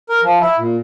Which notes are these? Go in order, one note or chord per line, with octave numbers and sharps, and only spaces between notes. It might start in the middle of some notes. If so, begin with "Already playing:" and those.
A#4
F3
E4
A#2